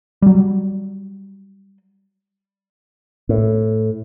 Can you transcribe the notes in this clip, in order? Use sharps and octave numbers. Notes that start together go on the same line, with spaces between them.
F#3 G3
A2